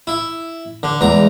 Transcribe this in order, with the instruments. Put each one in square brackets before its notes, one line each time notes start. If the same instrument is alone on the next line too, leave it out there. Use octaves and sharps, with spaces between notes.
[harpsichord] E4
D3
[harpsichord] E2 A#5 [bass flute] G#3